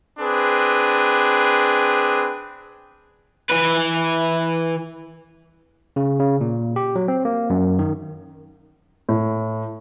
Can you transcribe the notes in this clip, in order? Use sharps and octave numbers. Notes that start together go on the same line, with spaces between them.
C4 D4 G#4 B4
E3 B4
C#3
C#3
A#2
G4
F#3
C4
A#3
F#2
D#3
A2